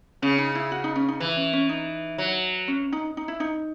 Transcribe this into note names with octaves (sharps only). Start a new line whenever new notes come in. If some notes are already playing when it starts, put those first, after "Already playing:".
C#3 C#4
D#4
E4
F#4
D#4
C#4
D#4
E3 E4
C#4
C#4
D#4
F#3
C#4
D#4
D#4
E4
D#4